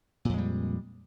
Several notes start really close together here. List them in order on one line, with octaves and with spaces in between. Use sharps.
A#2 F2 G#3 G3